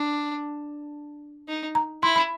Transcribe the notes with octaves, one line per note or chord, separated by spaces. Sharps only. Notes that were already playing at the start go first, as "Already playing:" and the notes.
Already playing: D4
D#4
A#5
E4 C6
B5